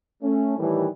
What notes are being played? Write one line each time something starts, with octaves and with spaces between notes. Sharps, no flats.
A3 C#4
A2 D#3 E3 G3